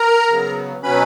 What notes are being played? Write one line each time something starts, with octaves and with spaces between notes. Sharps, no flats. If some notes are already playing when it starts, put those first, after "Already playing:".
Already playing: A#4 A#5
C#3 F#3 B3
B2 F#3 C#4 B4 B5